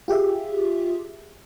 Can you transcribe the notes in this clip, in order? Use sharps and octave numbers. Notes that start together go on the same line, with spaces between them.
F4 G4 G#4 E5